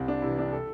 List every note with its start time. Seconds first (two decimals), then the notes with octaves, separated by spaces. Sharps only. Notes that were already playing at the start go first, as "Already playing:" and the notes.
Already playing: C2 C4
0.08 D4
0.22 C3 E3 E4
0.38 D4
0.53 A4